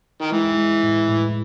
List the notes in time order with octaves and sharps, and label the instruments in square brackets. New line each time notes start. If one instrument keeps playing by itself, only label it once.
[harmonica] D#3
[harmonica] E3 [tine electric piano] G#3
[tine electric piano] G#3
A2
A2